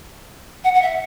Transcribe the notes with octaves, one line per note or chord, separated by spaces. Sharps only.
F#5
F#5
E5